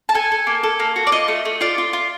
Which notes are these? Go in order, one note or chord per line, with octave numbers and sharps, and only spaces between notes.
A5
A4 G#5
A4
A#3
A4
A#3
F#4
D5
F4 D#5
A3
A3
F4 D5
F4
F4